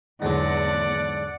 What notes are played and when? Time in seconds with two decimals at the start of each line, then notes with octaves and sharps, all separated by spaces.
0.22 E2 G#2 D3 F#3 D5 F#5